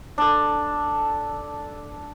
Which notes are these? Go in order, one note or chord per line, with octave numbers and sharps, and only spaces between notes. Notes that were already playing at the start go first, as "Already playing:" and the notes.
D4 A4